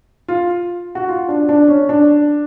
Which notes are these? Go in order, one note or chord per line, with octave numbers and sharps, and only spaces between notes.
F4
F#4
F4
D4
D4
C#4
D4